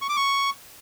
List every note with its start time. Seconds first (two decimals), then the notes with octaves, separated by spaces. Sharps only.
0.02 C#6
0.09 D6
0.17 C#6